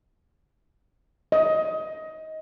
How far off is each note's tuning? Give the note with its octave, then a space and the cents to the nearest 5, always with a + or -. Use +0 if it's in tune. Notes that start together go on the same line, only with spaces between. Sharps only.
D#5 +20